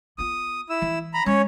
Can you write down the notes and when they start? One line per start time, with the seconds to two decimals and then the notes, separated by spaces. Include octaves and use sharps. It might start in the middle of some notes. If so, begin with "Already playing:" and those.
0.18 B3 F4 D#6
0.70 E4 E6
0.82 E3
1.14 A#5 B5
1.26 G#3 C#4 C#5